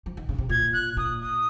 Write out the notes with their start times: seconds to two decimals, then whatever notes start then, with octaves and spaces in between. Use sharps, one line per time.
0.06 F3
0.17 D#3
0.29 C#3
0.39 C3
0.49 A#2 G#6
0.73 F#6
0.97 A#2 D#6
1.21 D#6